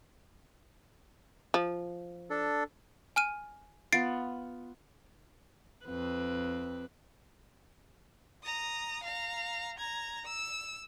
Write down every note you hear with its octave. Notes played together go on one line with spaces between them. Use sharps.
F3
D4 A4
G#5 F6 D#7
B3 F4 A6 C7 D7
F2 C4 B4
A#5 D#6
F5 A#5
A#5 G#6
E6